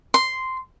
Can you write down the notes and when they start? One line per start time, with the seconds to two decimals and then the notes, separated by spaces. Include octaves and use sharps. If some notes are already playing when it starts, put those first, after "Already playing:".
0.14 C6